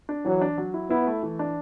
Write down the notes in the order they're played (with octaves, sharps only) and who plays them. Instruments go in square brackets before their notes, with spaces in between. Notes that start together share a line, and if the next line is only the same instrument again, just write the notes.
[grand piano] D4
[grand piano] E3 [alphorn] F#3
[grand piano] D4
F#3
E4
[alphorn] B3 [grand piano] E4
[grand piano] A3
E3
D4